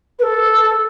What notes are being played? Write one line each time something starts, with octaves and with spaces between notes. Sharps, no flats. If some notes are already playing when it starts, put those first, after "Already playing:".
B4
A4